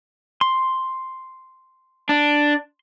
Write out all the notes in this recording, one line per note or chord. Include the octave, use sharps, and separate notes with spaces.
C6
D4